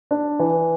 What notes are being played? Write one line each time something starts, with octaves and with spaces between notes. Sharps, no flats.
D4
E3